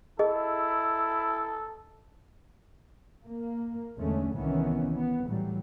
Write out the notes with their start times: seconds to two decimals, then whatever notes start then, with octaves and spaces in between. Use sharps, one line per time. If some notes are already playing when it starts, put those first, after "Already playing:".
0.19 E4 G#4 A4 D#5
3.25 A#3
3.97 E2 D3 G#3 A3 C#4
4.34 C2 D#3 E3 B3 C#4
4.95 B3
5.27 A2 E3 F#3 G3